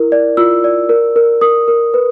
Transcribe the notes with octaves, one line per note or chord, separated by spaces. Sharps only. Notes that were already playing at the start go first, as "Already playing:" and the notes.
Already playing: E4 A#4
D5
F4 E6
D5
A#4
A#4
A#4 D#6
A#4
B4